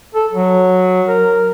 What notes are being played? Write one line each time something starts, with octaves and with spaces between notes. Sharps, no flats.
A4
F#3
A#4